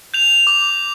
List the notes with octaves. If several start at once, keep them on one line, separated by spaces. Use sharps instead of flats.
G6 F7
D6